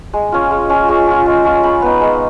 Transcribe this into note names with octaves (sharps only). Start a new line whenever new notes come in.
G#3
C#4 F4
G#3
C#4 F4
G#3 C#6
C#4 F4
G#3
C#4 F4
G#3 B5
B3 D#4
G#3